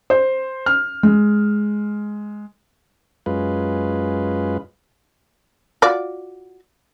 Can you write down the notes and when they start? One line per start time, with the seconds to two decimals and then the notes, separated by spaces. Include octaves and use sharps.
0.10 C5
0.66 F6
1.03 G#3
3.26 F#2 G#3 F4 B4
5.82 F4 F#4 D5